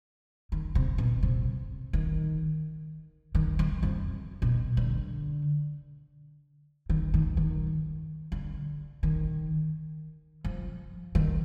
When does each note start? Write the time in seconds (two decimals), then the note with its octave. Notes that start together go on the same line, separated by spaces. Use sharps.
0.52 D#3
0.75 C3
0.98 B2
1.23 C3
1.93 D#3
3.35 D#3
3.59 D#3
3.83 F2
4.42 B2
4.77 D3
6.90 D#3
7.14 D#3
7.37 D#3
8.32 D3
9.03 D#3
10.45 F3
11.15 D#3